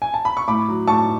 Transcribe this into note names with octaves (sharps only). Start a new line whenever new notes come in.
G#5
A5
B5
C#6
A2 B5 D6
F#3
A2 A5 C#6